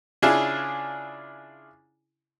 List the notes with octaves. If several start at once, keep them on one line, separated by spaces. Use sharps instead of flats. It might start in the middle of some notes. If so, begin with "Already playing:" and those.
C#3 D4 E4 F4 G#4 G#5